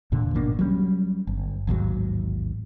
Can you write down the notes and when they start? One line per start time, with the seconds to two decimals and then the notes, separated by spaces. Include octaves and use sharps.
0.12 E2 A#2 D3
0.34 G#1 B2 A#3 D4
0.59 F#3 G3 C#4
1.27 G1
1.67 A1 D#2 G#2 F#3